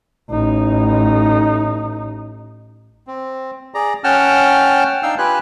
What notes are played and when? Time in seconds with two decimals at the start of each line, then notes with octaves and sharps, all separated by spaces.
0.30 A1 D#4
3.07 C4
3.74 G#4 D5 A#5
4.04 C#4 F#5 G5 A5 F6
5.03 D4 D#4 F5 G5 E6
5.18 F4 G4 B4 G#5 F#6